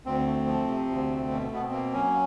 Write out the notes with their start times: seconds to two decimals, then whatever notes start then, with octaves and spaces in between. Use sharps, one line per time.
0.05 D2 C4
0.26 A3
0.47 F3
0.68 C3
0.89 D2
1.10 A3
1.31 B2
1.52 B2 B3
1.62 C4
1.73 A#3
1.93 F#3 C#4